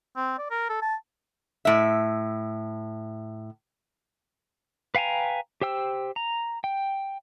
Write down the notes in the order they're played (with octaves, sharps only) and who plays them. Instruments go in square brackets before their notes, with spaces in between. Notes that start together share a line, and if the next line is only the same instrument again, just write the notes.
[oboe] C4
D5
A#4
A4
A5
[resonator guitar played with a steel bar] A2 E5
[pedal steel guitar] B4 F5 G5 G#5 A#5
G4 C5 G5 E6
A#5
G5